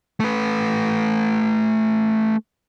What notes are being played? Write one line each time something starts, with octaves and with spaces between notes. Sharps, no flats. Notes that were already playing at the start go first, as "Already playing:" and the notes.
A3 B4